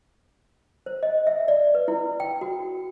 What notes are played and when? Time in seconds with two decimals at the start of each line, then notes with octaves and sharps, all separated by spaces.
0.86 C5
1.03 D#5
1.27 E5
1.48 D5
1.75 B4
1.88 E4
2.20 G5
2.41 F#4